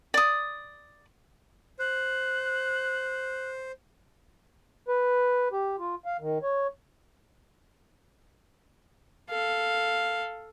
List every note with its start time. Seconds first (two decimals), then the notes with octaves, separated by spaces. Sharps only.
0.14 D5 D#6
1.79 C5 F#6
4.88 B4
5.52 G4
5.79 F4
6.05 F5
6.20 D#3
6.42 C#5
9.30 A4 F5